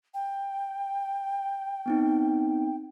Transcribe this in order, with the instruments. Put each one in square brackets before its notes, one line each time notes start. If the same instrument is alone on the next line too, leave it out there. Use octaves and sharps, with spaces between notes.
[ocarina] G5
[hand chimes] B3 C4 D#4